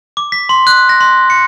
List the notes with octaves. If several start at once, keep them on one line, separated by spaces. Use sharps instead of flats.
D6
B6
C6
F#6
A#6
C6
C#7